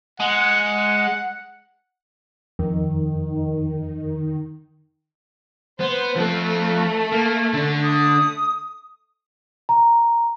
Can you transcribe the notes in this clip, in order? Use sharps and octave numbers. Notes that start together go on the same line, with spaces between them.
G#3 F#5
F2 D#3
B3 C5
F3 A3 C4
A#3
D3 D4
D#6
A#5